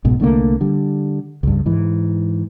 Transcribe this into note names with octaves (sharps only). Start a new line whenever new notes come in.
B1 G#2 B2
C2 D3 A3 A#3
D3 G3
C#2 G2
G#2 E3